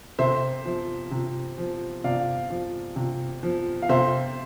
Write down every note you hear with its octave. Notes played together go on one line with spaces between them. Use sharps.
C3 C5 E5
F3
C3
F3
C3 D5 F5
F3
C3
F3
F5
C3 C5 E5